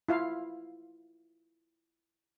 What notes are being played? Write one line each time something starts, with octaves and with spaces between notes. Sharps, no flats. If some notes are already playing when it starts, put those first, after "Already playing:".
E4 F4 F5